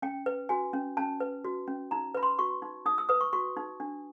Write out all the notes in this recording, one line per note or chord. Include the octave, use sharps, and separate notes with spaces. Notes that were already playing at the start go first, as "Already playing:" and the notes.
C#4 G5
B4
F#4 G#5
C#4
C#4 A5
B4
F#4
C#4
D#4 A#5
B4 B5
C6
F#4 C#6
D#4
D#4 D#6
E6
B4 D#6
C#6
F#4 C#6
D#4
D4